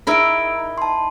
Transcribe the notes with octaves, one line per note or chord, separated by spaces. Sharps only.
D#4 E4 G#4 A#4 E6 D7
A5 C6